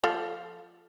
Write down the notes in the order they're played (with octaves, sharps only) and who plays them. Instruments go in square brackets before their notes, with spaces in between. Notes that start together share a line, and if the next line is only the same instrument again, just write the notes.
[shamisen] F3 A4 F5